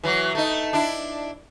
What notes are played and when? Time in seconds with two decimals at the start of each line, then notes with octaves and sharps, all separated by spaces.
0.04 E3 F#3
0.35 A3 D#4
0.73 D4 E4